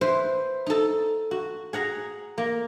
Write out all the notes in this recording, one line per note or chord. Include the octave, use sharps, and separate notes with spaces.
E4 B4 C5
D#4 A4
F#4
G#4 F#5 A#5
A#3